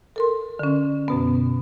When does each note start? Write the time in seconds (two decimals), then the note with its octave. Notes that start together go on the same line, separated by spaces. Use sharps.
0.16 A4 A#4 C6
0.59 D3 C#4
1.08 F#2 B2 B3